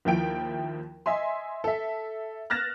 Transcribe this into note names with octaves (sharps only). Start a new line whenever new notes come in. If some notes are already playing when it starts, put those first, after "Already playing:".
D#2 F3 E4 G5 D7
D#5 E5 G#5 C6
A4 E5
F6 F#6 A6 A#6 E7